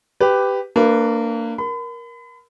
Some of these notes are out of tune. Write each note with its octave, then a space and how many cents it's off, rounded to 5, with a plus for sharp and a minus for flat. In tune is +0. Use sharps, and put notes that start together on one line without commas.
G4 +0 B4 +15
A#3 -25 D4 +0 B4 +0
A#4 +15 B5 +40